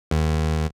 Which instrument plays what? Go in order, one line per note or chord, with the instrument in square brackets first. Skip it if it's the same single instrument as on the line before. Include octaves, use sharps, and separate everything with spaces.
[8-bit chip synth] D#2